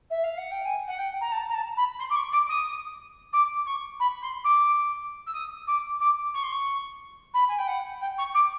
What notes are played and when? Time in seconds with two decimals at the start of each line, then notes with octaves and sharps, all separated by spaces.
0.10 E5
0.23 F5
0.37 F#5
0.51 G5
0.65 G#5
0.87 F#5
0.98 G5
1.21 A#5
1.32 A5
1.49 A#5
1.54 A5
1.77 B5
1.99 C6
2.10 D6
2.15 C#6
2.32 D6
2.49 D#6
3.33 D6
3.66 C#6
3.99 B5
4.22 C6
4.44 D6
5.26 E6
5.34 D#6
5.67 D6
6.00 D6
6.34 C#6
6.43 C6
6.52 C#6
7.34 B5
7.48 G#5
7.58 G5
7.67 F#5
8.01 G5
8.18 C#6
8.34 D6